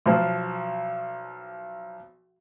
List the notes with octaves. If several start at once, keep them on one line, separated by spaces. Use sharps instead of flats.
B1 F3